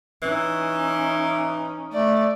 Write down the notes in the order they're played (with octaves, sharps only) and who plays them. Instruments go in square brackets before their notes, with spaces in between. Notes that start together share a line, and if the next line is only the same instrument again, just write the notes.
[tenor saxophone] E3 [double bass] C#4 D#4
[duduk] A3 [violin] D5